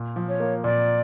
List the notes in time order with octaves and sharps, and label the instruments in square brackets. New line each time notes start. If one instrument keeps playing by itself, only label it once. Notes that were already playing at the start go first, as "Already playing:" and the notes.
Already playing: [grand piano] A#2
F3
[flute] C#5
[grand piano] A#3
[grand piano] A#2 [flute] D5